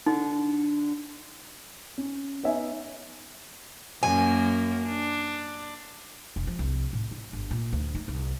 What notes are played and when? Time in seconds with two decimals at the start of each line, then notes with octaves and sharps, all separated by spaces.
0.06 D3 D#4
1.98 C#4
2.43 B3 D#4 C#5 D#5 E5 G#5
4.03 F#2 A#3 G#5
4.85 D4
6.36 E1
6.47 F3
6.59 C2
6.93 A2
7.11 E4
7.33 G1
7.51 A#2
7.73 D2
7.95 D#4
8.08 C2